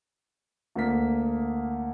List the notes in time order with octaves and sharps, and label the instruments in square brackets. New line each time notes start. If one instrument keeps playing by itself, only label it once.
[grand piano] D2 A#3 B6